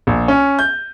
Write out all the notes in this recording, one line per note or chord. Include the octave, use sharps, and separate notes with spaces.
A#1
C#4
G6